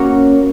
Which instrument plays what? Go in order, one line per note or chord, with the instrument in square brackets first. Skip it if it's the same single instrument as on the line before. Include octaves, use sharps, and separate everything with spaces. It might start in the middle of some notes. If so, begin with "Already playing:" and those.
Already playing: [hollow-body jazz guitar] A#3 C#4 F#4 A#4 C#5